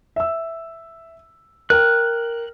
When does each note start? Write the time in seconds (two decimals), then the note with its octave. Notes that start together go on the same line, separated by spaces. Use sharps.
0.16 E5 E6
1.70 A#4 G5 F6 F#6